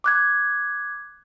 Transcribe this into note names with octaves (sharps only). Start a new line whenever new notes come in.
D6 F#6 G#6